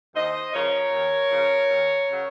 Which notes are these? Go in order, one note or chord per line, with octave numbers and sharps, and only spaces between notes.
D#2 C5 D#5
C#3 F3 A#4 C#5
D#2
C#3 F3
D#2
C#3 F#3